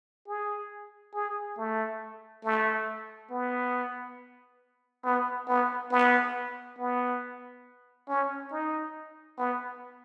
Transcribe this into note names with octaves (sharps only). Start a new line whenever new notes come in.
G#4
G#4
A3
A3
B3
B3
B3
B3
B3
C#4
D#4
B3